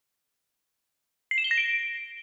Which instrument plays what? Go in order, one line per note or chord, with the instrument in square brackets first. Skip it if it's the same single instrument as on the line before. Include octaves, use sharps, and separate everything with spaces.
[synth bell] C7
E7
G7
A#6
D7